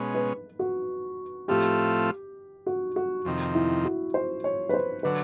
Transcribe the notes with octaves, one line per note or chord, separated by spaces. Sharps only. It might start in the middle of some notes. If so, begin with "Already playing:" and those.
Already playing: B2 G#3 C#4
B4
F#4
A2 F3 A3 C4 F4 G4
F#4
F#4
F2 C3 D#3
E4
F#4
C5
C#5
B4
C5
D3 F#3 B4